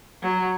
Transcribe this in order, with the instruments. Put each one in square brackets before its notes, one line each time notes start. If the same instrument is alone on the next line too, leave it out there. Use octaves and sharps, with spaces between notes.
[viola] F#3